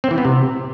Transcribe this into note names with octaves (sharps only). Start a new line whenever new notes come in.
C4
E3
B3
C3